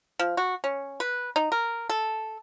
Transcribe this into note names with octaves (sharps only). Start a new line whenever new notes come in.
F3
F#4
C#4
B4
D#4
A#4
A4